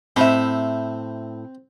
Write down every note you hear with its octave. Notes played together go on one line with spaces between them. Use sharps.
A2 C4 E5